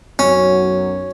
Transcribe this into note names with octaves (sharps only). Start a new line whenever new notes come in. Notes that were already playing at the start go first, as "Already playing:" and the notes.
B1 F#2 F#3 C#4